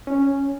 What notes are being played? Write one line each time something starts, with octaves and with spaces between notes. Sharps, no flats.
C#4